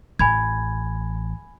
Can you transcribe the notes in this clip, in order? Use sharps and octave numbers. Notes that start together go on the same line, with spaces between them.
A1 G#5 B5 G#6